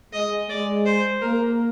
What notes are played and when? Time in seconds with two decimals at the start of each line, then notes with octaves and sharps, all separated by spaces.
0.13 G#3 D#5
0.49 G#3 D5
0.86 C5
1.22 A#3 A#4